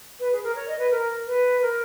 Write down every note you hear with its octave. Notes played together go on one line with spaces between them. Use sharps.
B4
G#4
A#4
C#5
D#5
B4
A#4
B4
A#4